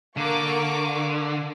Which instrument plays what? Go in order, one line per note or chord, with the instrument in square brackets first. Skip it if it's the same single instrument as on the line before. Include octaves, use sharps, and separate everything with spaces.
[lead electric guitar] D3 [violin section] A#3 C#6 D6